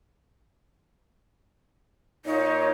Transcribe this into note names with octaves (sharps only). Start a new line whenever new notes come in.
A#2 D#4 C#5